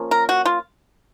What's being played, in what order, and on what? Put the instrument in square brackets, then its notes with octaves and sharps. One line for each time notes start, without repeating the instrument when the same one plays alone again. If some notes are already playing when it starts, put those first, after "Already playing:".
Already playing: [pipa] F3 A#3 C#4
A#4
F#4
F4